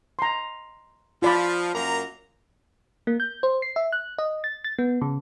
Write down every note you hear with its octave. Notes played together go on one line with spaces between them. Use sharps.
A#5 C6
F3 F4 D5 B5
F#2 A#3 A#5
A#3
G6
C5
C7
E5
F#6
D#5
A6
A6
B3
C#3